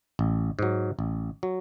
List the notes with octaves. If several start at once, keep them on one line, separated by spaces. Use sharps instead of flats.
A1
G#2 F#3
A1
F#3